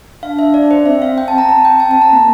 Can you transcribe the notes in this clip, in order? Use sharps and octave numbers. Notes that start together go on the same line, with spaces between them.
D4 F5
E5
D5
C5
C4 E5
F5
G5
A5
A#5
C4 A5
G5
A5
A5
A#5
A#3